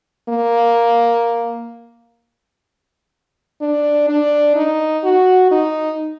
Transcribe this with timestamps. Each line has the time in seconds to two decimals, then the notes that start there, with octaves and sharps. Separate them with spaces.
0.29 A#3
3.61 D4
4.09 D4
4.55 D#4
5.04 F#4
5.51 D#4